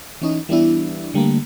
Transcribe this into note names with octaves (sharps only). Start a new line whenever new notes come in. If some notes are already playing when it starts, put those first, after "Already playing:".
E3 C#4 D#4
E3 G3 B3 D4 E4
D3 G3 A3 A#3